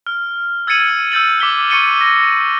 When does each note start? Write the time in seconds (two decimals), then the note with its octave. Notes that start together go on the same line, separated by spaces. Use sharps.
0.07 F6
0.67 E6 G#6 A6 C#7 D#7 F#7
1.12 E6 G6 A6 F#7
1.40 D6 B6 G7
1.70 C#6 A6 C#7 D#7 G7
2.01 A#6 D#7